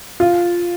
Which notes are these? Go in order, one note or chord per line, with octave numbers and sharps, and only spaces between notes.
F4